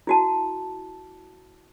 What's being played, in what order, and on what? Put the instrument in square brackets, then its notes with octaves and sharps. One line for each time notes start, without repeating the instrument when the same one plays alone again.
[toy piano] E4 F#4 A5